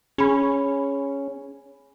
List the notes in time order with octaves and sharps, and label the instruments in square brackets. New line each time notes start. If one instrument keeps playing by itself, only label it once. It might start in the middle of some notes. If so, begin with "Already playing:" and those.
[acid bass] C#4 [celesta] G#4 B5